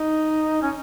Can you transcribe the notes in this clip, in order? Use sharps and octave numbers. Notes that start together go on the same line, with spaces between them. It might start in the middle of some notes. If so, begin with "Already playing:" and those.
Already playing: D#4
C#4